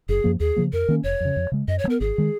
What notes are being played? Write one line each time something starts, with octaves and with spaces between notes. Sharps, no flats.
F#1 G#4
F#2 F3 A#3
D#2 G#4
C#3 F3 A#3
F2 A#4
D#3 A#3 C#4
F1 C#5
F2 C#3
F2
C#3 G#3
F#2 D#5
C#5
F3
B3 A#4
G#1 G#4
D#3 G#3